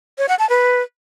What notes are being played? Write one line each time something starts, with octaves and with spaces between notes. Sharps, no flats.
C#5
F#5
A5
B4